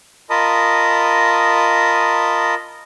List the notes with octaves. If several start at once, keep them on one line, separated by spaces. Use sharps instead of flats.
F4 A#4 D#5 A5 B5 D#6